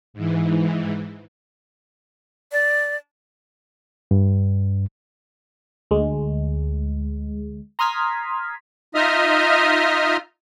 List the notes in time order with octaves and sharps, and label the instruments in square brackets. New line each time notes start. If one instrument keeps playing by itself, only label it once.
[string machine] G#2 E3
[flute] D5
[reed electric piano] G2
[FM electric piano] D2 G#3
A#5 C6 D#6 F6 G#6 B6
[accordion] D#4 F4 D#5 E5 D#6 F6